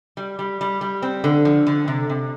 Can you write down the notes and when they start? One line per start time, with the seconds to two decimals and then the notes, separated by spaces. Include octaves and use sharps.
0.17 G3
0.39 G3
0.61 G3
0.81 G3
1.02 C4
1.24 D3
1.45 F3
1.67 D3
1.88 C3
2.10 C3